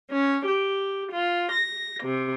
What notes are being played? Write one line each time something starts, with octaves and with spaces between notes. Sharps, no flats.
C#4
G4
F4
A#6
C3